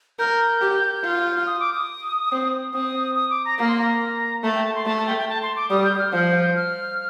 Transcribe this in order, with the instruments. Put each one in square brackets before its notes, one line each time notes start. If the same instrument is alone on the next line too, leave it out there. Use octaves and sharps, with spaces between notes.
[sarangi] A#4 [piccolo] G6
[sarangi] G4
F4
[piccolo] D#6
D6
D#6
[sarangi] C4
[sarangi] C4 [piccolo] D#6
[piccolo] D#6
D6
A#5
[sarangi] A#3 [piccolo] A#5
[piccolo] C6
A#5
[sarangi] A3 [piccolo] A5
[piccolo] G5
A5
C6
[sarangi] A3 [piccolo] A5
[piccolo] A5
G5
G5
A5
C6
D6
[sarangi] G3 [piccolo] D#6
[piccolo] G6
D#6
F6
[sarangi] F3 [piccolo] G6
[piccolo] F6